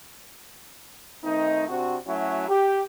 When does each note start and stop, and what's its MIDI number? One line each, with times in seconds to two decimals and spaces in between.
1.24 1.64 51
1.24 1.64 57
1.24 1.64 60
1.24 1.64 63
1.69 1.96 48
1.69 1.96 60
1.69 1.96 62
1.69 1.96 66
2.07 2.47 54
2.07 2.47 57
2.07 2.47 61
2.07 2.47 64
2.07 2.47 66
2.49 2.81 67